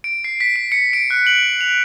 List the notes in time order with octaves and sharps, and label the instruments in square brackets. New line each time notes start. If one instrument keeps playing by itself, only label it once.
[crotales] D7
C7
B6
D7
C#7
D7
F#6
F#7
F7